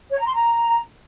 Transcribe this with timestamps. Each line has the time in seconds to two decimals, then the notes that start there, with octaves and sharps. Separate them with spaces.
0.11 C#5
0.18 A#5
0.26 C6
0.34 A#5